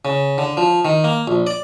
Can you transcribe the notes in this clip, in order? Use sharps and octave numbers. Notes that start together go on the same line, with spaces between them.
C#3
D3
F3
D#3
A#3
A#1
D5